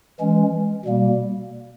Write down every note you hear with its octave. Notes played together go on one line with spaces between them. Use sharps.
E3 G#3 C#4
B2 G3 A#3